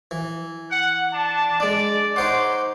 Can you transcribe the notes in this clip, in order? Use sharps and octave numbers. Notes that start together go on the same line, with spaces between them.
E3
F#5
D4 A5
G#3 D4 D5
D#4 C5 C#5 F#5 C6 D6